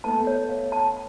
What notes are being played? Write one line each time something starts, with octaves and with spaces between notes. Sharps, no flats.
A3 B3 A5
C#5
F5
A5